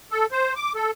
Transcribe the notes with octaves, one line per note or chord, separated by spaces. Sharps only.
A4
C5
D6
A4